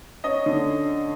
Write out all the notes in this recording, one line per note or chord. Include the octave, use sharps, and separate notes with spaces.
C#4 D#5
D3